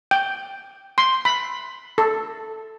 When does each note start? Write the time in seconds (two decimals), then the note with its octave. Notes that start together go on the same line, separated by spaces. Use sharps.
0.11 G5
0.98 C6
1.25 B5
1.98 A4